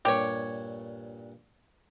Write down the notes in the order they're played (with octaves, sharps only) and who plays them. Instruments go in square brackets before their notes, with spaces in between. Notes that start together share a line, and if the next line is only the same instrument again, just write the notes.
[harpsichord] G2 A#2 [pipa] G4 C#5